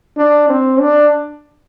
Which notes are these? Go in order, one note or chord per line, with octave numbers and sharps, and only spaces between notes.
D4
C4
D4